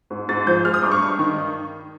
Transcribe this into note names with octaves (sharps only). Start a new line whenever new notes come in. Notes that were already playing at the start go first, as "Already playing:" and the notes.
G#2
G#2 A6
F3 G6
G#3 F6
D#6
G2 D6
C#6
G2
D#3